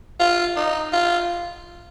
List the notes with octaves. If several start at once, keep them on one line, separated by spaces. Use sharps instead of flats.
F4
D#4
F4